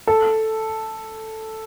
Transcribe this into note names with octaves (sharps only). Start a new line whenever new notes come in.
A4